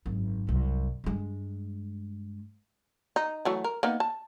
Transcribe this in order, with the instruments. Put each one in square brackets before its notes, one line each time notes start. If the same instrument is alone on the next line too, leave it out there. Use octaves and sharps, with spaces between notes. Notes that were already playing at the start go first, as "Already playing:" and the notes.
[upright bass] G#1 F#2
C2 F#2
G2 G#3
[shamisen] D#4
E3 F#3 A3
A#4
A#3 B3 D#4
A5